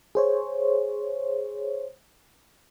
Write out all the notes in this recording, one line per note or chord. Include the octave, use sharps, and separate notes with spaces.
G#4 C5 C#5